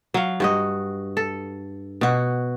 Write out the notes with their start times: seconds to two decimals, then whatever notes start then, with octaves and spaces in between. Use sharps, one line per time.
0.14 F#3 F5
0.40 G2 F#4 D#5
1.17 A4
2.01 B2 F#4